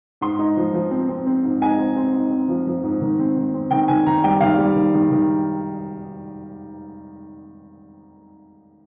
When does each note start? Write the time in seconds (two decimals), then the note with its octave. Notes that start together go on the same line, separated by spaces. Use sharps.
0.21 G#2 C6
0.39 D#4
0.57 F3
0.74 F3
0.91 C4
1.09 C4
1.27 C4
1.44 G#2
1.61 D#4 G#5
1.79 C4
1.97 C4
2.14 D#4
2.31 C4
2.49 F3
2.67 F3
2.83 G#2
3.01 D#3
3.19 C4
3.37 D#3
3.54 C4
3.71 D#3 G5
3.88 D#3 G#5
4.06 D#3 A#5
4.24 G3 G5
4.41 D#3 F5
4.58 G3
4.75 D#3
4.94 D#3
5.11 D#3